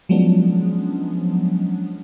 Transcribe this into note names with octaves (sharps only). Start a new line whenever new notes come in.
F3 F#3 G#3 B3 C#4 D4